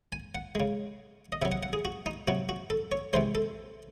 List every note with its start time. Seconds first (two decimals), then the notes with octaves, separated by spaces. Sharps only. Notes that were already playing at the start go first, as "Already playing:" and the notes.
0.12 G#5
0.35 F#5
0.55 C#3 G#3
1.32 D#5
1.42 C3 E5
1.45 F#3
1.52 F#5
1.63 F#5
1.73 G#4
1.85 F#4
2.06 D#4
2.28 C3 F#3 F#4
2.49 F#4
2.70 A4
2.92 C#5
3.13 C3 E3 G#3 C5
3.35 A4